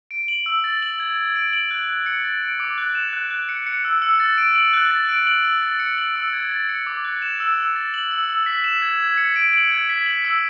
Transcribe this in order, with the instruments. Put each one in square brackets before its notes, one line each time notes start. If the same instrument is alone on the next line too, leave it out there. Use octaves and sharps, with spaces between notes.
[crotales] D7
F#7
E6
A6
F#7
G#6
G#6
D7
F#7
F#6
F#6
C#7
A6
D7
D6
F#6
E7
F#6
F#6
C#7
C#7
E6
E6
A6
D7
F#7
F#6
A6
D7
F#7
E6
A6
C#7
F#7
E6
G#6
A6
C#7
D6
F#6
E7
E6
E6
A6
F#7
E6
E6
B6
E7
G#6
G#6
C#7
D7
F#7
G#6
B6
F#7
E6